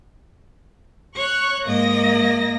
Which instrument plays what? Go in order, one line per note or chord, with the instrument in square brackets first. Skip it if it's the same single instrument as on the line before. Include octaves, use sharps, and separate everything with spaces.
[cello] C#5 [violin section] C#6 F#6
[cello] G#2 D#5 [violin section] A#3 A#6